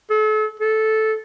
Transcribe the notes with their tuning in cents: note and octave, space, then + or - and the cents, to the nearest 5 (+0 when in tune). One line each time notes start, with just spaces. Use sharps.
A4 -40
A4 -10